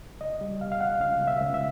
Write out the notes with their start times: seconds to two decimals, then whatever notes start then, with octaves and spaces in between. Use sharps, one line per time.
0.21 C#2 D#5
0.41 G3
0.61 B2 F5
0.72 F5
0.80 C#2 F#5
1.01 C#2 F5
1.21 B2
1.28 E5
1.41 C#2
1.54 E5